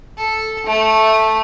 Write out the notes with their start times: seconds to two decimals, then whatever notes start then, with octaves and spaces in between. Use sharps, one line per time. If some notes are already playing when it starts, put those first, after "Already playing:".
0.18 A4
0.66 A3